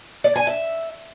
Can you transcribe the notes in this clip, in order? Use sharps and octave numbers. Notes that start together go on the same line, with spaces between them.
D5
G#5
E5